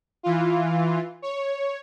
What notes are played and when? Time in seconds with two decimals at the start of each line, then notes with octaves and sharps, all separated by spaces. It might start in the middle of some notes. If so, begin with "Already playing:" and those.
0.23 E3 F4
1.22 C#5